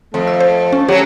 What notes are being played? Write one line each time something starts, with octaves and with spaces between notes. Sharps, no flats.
F2 A3
E6
C5
C#4
F#3 C#4 G4 C#5